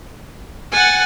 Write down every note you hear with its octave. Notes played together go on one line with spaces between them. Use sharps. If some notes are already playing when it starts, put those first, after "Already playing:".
F#5 G#5 A6